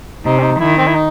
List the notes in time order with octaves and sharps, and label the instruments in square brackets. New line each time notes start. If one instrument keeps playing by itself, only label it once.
[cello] C3 [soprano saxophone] D#4
[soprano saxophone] C4
D#4
[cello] D#3 [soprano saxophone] E4
[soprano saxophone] C4
E4
D#4